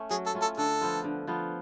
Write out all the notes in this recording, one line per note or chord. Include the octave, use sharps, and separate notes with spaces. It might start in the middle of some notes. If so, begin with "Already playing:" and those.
Already playing: A3 C#4
F#3 G#4
A4
A3 C#4 F4
A4
D3 A4
F3 B3 F4
D3
F3 B3 F4